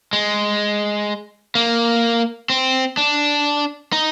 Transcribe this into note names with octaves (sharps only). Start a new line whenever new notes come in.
G#3
A#3
C4
D4
D#4